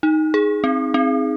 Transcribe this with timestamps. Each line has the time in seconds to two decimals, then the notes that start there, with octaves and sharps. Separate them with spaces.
0.03 D#4
0.34 G#4
0.64 C4
0.94 C4